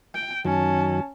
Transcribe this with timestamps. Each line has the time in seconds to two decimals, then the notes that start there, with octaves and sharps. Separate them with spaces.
0.15 G5
0.45 F#2 D#3 F#3 C#4 A5